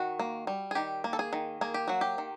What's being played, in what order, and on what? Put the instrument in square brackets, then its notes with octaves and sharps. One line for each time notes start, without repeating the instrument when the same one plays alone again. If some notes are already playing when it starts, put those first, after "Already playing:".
Already playing: [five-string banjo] D#3 F#4
A#3
G3
G#4
D#3 G4
A#3
A4
G#4
D#3
A#3 G#4
G4
F#3 F#4
G4
D#3